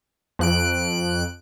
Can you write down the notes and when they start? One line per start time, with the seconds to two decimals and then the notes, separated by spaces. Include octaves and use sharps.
0.39 F2 F#6 D7